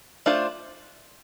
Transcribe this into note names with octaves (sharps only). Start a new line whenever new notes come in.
A3 D4 F4 C5